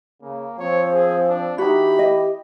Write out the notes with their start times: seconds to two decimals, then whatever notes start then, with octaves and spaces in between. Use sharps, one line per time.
0.22 C#3 A#3
0.59 F3 C4 C#5
0.92 G#4
1.29 D4
1.58 E3 D#4 F#4 G4 B5
1.99 D#5